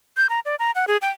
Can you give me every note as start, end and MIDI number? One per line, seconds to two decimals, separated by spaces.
0.17 0.27 91
0.29 0.40 82
0.45 0.55 74
0.59 0.71 82
0.75 0.85 78
0.88 0.97 68
1.02 1.10 79